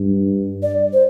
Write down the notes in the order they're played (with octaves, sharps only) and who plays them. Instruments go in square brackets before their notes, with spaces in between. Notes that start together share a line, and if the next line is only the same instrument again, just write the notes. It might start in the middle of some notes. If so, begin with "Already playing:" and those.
Already playing: [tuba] G2
[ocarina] D5
C5